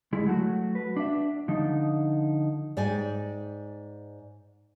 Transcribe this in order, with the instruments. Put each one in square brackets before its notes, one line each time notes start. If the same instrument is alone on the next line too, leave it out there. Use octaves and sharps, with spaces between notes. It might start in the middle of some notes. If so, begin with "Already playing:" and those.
[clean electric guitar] D2 G#3 E4
F#3 A3 F#4
B4
D4 E5
D3 F3 D#4
[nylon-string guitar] G#2 D5 G5 G#5